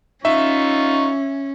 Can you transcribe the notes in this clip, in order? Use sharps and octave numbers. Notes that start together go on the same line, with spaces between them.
C#4 D#4 F4 E5 C#6